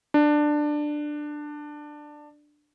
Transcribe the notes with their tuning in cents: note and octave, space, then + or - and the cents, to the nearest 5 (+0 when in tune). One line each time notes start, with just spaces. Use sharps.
D4 +15